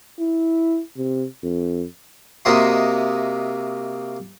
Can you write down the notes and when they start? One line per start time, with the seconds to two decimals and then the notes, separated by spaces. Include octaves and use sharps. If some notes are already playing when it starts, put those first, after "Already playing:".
0.19 E4
0.97 C3
1.43 F2
2.45 C3 A#3 F#4 D#5 E5 C6